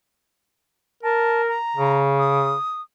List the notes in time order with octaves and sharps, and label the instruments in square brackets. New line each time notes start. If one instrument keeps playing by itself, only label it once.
[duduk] A#4 [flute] A5
[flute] A#5
[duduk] C#3
[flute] D#6